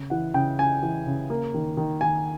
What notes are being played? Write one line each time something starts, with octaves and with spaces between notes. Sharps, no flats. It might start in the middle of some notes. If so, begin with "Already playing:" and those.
Already playing: C#3
E3 F#5
C#3 G5
C#3 G#5
E3
C#3
A#3
D#3
D#3
D#3 G#5